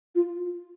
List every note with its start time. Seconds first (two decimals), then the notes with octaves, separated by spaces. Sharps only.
0.15 F4